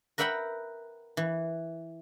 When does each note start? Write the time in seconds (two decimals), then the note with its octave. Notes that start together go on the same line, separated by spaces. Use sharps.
0.18 A#4 B4 E5 F#5 G5 B5
1.17 E3